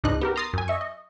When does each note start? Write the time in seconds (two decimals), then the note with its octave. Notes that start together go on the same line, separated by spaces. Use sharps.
0.04 C#2 G#2 D4 D#4 D#5 F#6
0.21 B3 G4 A#4
0.36 A#5 C6 D#6 A6 C7
0.54 F#2 G#5
0.68 D#5 E5 C#6
0.81 D#5